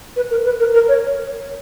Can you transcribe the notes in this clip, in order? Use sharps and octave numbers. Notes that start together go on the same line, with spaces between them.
B4
A#4
B4
A#4
A#4
C#5